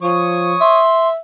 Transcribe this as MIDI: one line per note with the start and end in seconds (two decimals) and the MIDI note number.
0.02 0.55 53
0.02 0.79 73
0.02 0.79 85
0.02 0.79 87
0.61 1.17 76
0.61 1.09 84